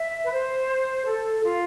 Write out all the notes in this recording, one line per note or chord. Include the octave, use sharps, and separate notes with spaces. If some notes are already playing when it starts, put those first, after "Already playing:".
Already playing: E5
B4
C5
A4
F4